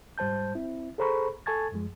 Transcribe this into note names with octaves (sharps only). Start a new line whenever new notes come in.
G#2 G3 C5 A5 G6
C4 E4
G#4 A4 C5 A#5 B5 C#6
A4 G#5 A5 C#6 G#6 A6
F#2 F3 G#3